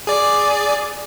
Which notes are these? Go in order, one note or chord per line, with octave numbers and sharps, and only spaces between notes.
G#4 D5